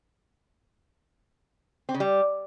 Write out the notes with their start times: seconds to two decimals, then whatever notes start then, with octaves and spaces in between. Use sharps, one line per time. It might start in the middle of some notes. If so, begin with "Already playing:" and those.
1.89 C4
1.94 C#3
2.00 G3